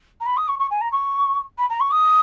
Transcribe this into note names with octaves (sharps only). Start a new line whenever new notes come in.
A#5
B5
D#6
C#6
C#6
G#5
A#5
C#6
B5
A#5
C#6
D#6